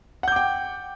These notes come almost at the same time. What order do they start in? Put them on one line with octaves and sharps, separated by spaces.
F#5 G6 D6 G5